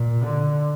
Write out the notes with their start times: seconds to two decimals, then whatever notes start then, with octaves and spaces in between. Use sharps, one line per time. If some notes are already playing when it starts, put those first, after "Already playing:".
Already playing: A#2
0.24 D3